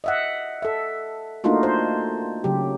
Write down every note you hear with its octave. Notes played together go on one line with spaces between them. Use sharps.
D#5 E5 F#5
A4 E5
A3 A#3 D4 D#4 F4 F#4
C5
C#3 F#3 G4